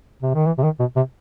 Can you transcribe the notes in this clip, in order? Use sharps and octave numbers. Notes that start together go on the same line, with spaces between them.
C3
D#3
E3
C3
D#3
B2
C3